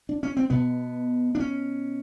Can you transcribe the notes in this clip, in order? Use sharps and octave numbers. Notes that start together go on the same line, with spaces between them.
D4
C#4
C4
B2 B3
D4
C#4